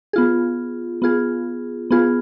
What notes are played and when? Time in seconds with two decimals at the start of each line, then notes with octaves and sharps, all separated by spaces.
0.13 B3 F4 G#4
1.02 B3 F4 G#4
1.91 B3 F4 G#4